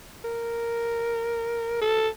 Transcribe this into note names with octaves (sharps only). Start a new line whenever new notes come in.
A#4
A4